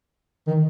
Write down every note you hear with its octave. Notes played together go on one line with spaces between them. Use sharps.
D#3